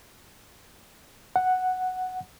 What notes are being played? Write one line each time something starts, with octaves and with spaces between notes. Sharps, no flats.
F#5